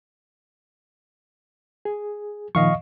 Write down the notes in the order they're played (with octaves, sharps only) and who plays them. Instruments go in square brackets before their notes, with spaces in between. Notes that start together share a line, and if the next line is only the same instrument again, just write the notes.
[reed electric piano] G#4
[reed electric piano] A#2 D#3 F3 [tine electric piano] D#5 F5 C#6